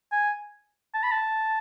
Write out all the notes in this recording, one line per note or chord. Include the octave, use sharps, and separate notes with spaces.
G#5
A5
B5
A5